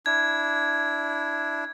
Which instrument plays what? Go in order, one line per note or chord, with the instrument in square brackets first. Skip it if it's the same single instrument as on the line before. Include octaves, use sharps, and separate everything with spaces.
[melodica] D4 E4 [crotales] G#6